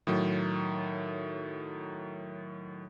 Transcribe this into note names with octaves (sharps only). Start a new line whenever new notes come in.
A2 D#3 F#3